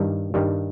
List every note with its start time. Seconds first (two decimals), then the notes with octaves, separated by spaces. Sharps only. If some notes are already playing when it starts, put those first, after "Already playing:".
Already playing: G2 D#3 G3
0.34 G2 D#3 G3